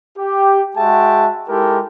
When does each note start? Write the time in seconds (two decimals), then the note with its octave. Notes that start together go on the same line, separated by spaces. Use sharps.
0.18 G4
0.77 G#3 F#4 G#4 E5 G5 A5
1.48 G#3 D#4 E4 G4 A4 A#4